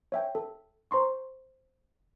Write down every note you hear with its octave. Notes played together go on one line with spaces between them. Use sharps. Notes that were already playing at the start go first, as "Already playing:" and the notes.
C#5 E5 G5
A4
C5 A#5 C6 C#6